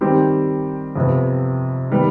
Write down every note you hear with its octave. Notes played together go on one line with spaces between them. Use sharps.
D#3 G3 C4 G4
F2 C3 F3 B3
D#3 G3 B3